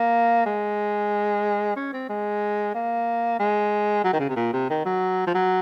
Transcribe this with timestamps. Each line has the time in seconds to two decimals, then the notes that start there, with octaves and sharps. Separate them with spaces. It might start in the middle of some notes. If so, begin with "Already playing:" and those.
Already playing: A#3
0.46 G#3
1.76 C#4
1.93 C4
2.09 G#3
2.74 A#3
3.39 G#3
4.04 F#3
4.13 D#3
4.20 C#3
4.29 C3
4.36 A#2
4.53 C3
4.70 D#3
4.85 F#3
5.27 F3
5.34 F#3